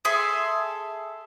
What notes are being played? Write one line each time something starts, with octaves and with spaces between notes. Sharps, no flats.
G#4 A4 E5 C6